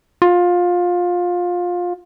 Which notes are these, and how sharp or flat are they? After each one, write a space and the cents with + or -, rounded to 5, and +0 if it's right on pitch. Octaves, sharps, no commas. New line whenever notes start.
F4 +20